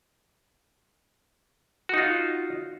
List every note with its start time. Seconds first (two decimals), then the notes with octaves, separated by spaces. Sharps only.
1.89 F#4
1.94 D#4
1.98 F4